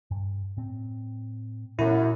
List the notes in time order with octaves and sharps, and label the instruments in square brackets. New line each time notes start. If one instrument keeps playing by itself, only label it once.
[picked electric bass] G2
A2 C4
[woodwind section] F#2 [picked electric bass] A#2 E3 B3 [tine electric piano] E4